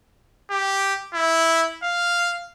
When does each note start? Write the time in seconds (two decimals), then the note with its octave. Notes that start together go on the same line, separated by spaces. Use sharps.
0.51 G4
1.14 E4
1.83 F5